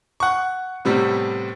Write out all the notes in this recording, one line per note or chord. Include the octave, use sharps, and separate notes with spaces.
F#5 C#6
A2 C3 G3 B3